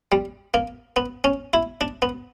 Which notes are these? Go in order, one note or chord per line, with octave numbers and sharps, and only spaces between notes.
G3
A#3
B3
C#4
E4
D4
B3